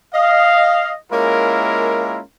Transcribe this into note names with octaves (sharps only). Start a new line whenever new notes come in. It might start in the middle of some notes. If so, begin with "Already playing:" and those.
D#5 F5
G#3 A#3 C#4 E4 F4 A#4